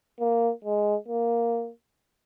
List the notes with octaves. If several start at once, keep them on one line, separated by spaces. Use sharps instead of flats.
A#3
G#3
A#3